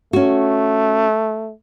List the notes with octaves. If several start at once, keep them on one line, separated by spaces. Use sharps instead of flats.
A3 C#4 F#4